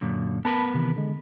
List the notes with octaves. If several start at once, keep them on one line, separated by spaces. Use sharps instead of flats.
F#2 A#2 D3
B3 A#4 B4 A5 B5
C3 D#3 E3
D3 G#3